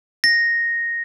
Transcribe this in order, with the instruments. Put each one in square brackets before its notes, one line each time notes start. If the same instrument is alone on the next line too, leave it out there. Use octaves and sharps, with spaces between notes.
[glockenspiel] A#6